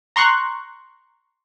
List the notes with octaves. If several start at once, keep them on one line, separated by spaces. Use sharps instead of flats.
A#5 C6 C#6 F#6